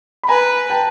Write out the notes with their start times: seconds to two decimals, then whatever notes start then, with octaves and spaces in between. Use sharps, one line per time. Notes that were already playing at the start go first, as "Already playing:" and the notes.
0.23 B5
0.28 B4 G#5 A#5
0.70 G5 A5